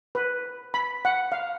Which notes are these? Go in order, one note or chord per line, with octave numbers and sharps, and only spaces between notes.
B4
B5
F#5
F5